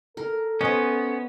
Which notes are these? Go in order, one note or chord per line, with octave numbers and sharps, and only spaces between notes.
A4 A#4
B3 C#4 C5 D#5